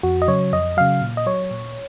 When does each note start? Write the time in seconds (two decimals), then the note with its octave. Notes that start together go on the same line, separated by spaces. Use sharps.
0.03 F2 F#4
0.22 D#5
0.28 C#3 F#3 C#5
0.53 F2 D#5
0.77 C#3 F#3 F5
1.02 A#2
1.17 D#5
1.26 F#3 C#5
1.51 A#2